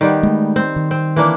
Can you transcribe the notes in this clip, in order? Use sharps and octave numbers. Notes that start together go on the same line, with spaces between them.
D#3 G3 B3
G#3 A3
C4
D#3
C4
E3 A#3 D4